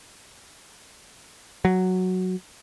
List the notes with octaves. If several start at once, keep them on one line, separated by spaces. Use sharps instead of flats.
F#3